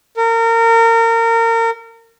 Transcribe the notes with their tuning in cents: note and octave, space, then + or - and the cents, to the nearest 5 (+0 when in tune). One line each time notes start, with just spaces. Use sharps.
A#4 -30